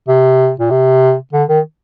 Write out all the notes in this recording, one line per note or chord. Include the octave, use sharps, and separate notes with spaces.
C3
A#2
C3
D3
D#3